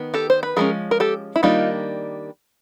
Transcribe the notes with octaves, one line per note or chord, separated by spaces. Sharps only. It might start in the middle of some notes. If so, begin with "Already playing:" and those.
Already playing: D#3 B3
G4 A4
C5
B4
F3 G#3 C#4 G#4 A#4
A#4
G4 A4
E4
D#3 G3 A#3 D4 D#4 F4